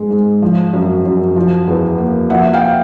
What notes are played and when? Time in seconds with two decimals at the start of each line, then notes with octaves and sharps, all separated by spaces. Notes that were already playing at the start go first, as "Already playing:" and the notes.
Already playing: G#2 G#3
0.11 G#2
0.42 F3
0.73 F#2
1.05 F#2
1.36 F3
1.68 E2
1.98 A#3
2.30 F3 E5 F#5
2.53 F5 G5